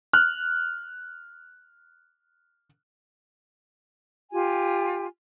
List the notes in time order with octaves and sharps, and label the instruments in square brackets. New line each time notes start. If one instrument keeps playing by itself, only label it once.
[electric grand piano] F6 F#6
[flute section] F4 G4 G#5